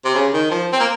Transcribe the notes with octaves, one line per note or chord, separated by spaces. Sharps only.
C3
C#3
D#3
F3
C4
A#3